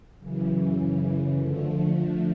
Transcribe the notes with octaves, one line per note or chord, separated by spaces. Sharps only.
F#2 C#3 E3
D3 F3 A3